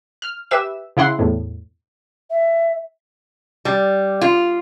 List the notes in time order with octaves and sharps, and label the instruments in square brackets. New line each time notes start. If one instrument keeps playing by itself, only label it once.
[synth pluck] F6
G4 B4 E5 E7
C#3 E4 F#5 C6
E2 A2
[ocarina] E5
[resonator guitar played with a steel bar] G3
F4